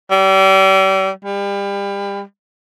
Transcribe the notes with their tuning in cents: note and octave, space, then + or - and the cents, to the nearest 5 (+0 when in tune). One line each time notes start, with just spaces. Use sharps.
G3 -35
G3 +30